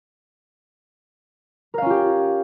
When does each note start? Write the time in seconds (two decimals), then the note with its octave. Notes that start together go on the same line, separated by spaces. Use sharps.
1.74 A#4
1.78 F5
1.82 C#4
1.86 F4
1.90 G4